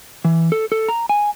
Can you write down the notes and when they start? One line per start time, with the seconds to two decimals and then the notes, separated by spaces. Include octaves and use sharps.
0.25 E3
0.52 A4
0.72 A4
0.89 A#5
1.09 G#5